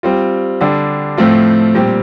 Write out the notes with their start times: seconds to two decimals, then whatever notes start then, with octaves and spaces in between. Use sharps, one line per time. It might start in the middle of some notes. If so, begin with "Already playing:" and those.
0.03 G3 C4 F4
0.61 D3 G3 D4 G4
1.17 A2 F3 A3 C4 F4
1.75 A#2 G3 C4 G4